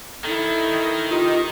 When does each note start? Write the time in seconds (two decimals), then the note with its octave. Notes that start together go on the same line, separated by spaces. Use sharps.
0.24 D#3 E4 A4
1.10 C3 D#4 F4